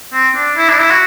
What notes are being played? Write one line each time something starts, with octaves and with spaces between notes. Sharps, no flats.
C4
D4
E4
D4
E4
F#4